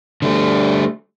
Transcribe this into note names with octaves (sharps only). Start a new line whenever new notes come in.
D3 G3 A3